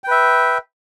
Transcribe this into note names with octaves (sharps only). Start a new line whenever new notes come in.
B4 E5 G5